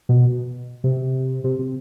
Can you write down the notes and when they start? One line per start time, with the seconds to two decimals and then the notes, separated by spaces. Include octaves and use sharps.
0.09 B2
0.84 C3
1.44 C3
1.59 C3